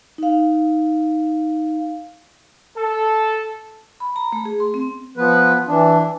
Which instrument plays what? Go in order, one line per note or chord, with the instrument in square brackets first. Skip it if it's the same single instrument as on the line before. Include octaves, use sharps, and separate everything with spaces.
[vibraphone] D#4 F5
[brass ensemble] A4
[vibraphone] B5
A#5
A3
G#4
C6
C4
[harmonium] F3 B3 B4
E3 D4